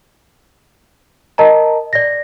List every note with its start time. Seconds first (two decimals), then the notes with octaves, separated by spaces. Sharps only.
1.38 A#4 D#5 A5 A#5
1.93 D5 A#6